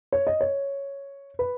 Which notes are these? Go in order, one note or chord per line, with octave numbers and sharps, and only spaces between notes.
C#5
D#5
C#5
B4